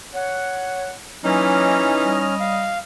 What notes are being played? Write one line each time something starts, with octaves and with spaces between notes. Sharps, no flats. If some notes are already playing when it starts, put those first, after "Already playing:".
C#5 F#5
E3 F#3 A#3 C#4 D#4 F6
G3 D#5
F5